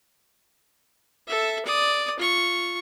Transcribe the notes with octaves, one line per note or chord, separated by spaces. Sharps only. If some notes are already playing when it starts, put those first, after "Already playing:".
A4 E5
D5 D#6
F4 C#6